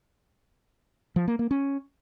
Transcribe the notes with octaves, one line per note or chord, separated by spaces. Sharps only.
F3
A#3
A#3
C#4